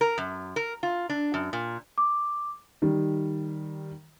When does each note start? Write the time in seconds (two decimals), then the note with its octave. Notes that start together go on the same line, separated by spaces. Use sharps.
0.01 A#4
0.18 F#2
0.56 A#4
0.83 F4
1.09 D4
1.34 F#2
1.53 A#2
1.98 D6
2.82 D#3 G3